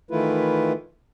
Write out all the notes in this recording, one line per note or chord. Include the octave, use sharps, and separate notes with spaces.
D#3 E3 A3 E4 F4 B4